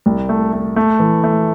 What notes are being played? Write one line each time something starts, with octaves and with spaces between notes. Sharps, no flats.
C2
A3
A3
A3
E3
A3